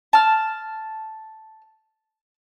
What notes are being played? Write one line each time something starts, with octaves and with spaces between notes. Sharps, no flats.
A5 F6